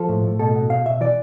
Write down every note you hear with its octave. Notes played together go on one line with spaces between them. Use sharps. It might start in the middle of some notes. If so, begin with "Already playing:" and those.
Already playing: F3 A4
A2
A2
B2 A4
B2
B2 F5
B2 E5
E3 D5